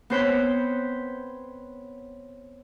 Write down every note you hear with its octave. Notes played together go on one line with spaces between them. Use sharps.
B3 C4 C5 C#5 B5 G6